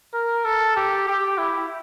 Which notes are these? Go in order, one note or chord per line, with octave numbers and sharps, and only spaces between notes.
A#4
A4
G4
G4
E4